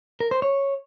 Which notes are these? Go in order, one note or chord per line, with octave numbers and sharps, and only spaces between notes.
A#4
C5
C#5